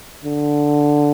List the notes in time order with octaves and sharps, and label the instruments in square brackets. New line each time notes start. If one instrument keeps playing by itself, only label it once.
[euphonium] D3